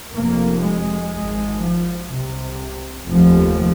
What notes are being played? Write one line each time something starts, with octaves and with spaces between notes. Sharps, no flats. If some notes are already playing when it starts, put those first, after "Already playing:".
F1 F2 C3 A#3
G#3
G#1 G#2
F3
C2 C3
F1 D#2 F3